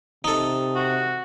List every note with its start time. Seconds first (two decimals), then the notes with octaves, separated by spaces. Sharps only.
0.24 C3 D#4 A4
0.75 F#4